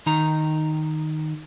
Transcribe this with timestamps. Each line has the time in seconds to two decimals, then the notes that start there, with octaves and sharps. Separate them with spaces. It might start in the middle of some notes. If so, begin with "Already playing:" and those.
0.06 D#3 D#4 A#5